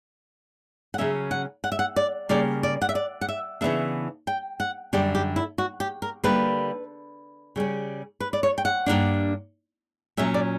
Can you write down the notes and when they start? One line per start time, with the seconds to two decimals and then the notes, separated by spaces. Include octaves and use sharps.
0.94 F#5
0.98 C#3 F#3 C#4 E5
1.31 F#5
1.64 F#5
1.72 E5
1.79 F#5
1.96 D5
2.29 C#3 G3 A#3 D5
2.63 D5
2.82 F#5
2.89 E5
2.95 D5
3.21 F#5
3.29 E5
3.61 C#3 E3 B3 D4 E5
4.27 G5
4.60 F#5
4.93 F#2 D3 G3 G4
5.15 G4
5.36 E4
5.58 F#4
5.80 G4
6.02 A#4
6.24 D3 G3 A#3 B4
7.56 C#3 G3 C#4
8.20 B4
8.33 D5
8.43 C#5
8.58 G5
8.65 F#5
8.86 G2 E3 A#3 D4
10.17 A#2 F#3 C#4 E5
10.34 D5